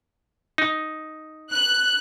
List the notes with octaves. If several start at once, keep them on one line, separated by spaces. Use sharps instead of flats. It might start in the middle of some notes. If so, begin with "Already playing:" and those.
D#4
F#6